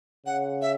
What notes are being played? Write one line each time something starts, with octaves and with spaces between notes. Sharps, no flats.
C#3 F#5
E5